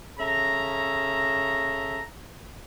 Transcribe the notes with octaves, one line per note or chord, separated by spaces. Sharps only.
C#3 A4 E5 A#5